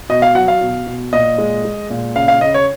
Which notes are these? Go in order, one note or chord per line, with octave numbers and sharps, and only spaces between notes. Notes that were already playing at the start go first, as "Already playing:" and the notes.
B2 D#5
F5
F#3 F#5
F5
B2
B2
A#2 D#5
G#3
G#3
A#2
C#3 F5
F5
C#3 D#5
C#5